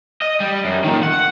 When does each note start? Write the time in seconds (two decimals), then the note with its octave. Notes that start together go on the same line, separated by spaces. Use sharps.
0.22 D#5
0.40 G3
0.65 F#2
0.84 A#2 D#3
1.03 F#5